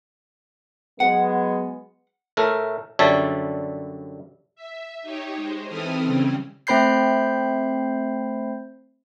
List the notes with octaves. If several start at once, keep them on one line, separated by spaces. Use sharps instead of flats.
F#3 G#3 B3 F#5
A2 A3 A#4
F#2 D3 G3 C#5 E5 A5
E5
D#4 G4 C#5
G#3 C5
E3 C4 E4 A4 D#6 F6
C#3 G3 C4 C#4
A3 C4 C5 B5 G6 C7